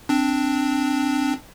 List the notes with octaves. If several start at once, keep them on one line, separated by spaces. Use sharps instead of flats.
C4 D4